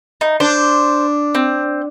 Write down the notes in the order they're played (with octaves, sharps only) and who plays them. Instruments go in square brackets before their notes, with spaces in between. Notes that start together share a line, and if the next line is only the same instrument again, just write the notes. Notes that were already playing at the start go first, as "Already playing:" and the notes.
[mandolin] D#4
[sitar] D4 [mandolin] C5
[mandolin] C4